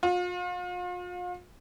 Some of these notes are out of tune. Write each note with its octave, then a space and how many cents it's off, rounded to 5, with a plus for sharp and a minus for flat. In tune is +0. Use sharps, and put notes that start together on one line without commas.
F4 +40